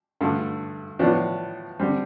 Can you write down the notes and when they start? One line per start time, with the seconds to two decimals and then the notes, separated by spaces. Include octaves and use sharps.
0.21 G2 D3 A3
0.99 A2 F3 B3 D4
1.79 D3 G3 C4